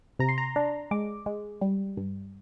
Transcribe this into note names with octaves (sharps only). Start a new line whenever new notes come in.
C3 A#5
C6
A#5
D4
G#3 D6
G#3
G3
G2